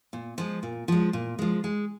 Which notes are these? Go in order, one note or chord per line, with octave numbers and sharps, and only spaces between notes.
A#2
F3 G#3
A#2
F3 G#3
A#2
F3 G#3
G#3